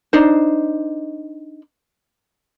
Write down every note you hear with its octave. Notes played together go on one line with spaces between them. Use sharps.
D4 D#4 C5